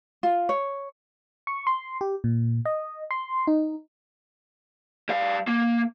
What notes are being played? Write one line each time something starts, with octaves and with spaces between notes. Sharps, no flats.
F4
C#5
C#6
C6
G4
A#2
D#5
C6
D#4
G3 F5
A#3